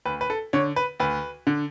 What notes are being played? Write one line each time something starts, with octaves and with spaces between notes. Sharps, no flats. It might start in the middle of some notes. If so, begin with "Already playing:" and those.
D2 B4
B4
A4
D3 C#5
B4
D2 B4
D3